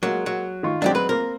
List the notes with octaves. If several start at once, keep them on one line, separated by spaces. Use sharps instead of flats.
F#3 G#3 A#3
F#3
D#3 F4 C#6
F#3 G#3 C4 D4 D#4 G4
B4
A#3 C4 A#4